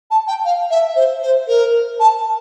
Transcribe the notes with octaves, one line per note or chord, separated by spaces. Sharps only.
A5
G5
F5
E5
C5
C5
A#4
A5